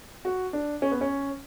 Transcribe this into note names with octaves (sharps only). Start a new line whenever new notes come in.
F#4
D4
C#4
B3
C#4